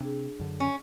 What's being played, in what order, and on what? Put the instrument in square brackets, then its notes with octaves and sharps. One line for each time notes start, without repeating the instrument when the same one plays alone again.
[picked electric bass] C3 [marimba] D4 G#4
[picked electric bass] F#2 D3
[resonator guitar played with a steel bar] C#4